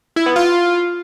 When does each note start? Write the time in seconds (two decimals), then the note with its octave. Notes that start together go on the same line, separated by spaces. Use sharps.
0.16 E4
0.26 B3
0.36 F4